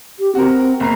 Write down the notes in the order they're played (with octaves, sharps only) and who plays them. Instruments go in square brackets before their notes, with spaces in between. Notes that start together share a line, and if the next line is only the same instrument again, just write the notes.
[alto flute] G4
[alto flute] C4 [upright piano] F#4 A#4
[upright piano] F#1 A#5 C7